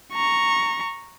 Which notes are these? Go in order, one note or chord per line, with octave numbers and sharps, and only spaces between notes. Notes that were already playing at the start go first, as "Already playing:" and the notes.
A#5 C#6